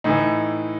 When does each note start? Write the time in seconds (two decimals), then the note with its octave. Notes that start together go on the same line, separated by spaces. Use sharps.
0.04 A2 E3 D#4